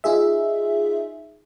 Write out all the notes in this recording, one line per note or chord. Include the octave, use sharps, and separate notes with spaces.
D#4 F4 G#4 E5